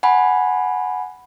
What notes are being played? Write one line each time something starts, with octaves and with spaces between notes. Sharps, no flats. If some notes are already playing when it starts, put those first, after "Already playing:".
F#5 G#5 B5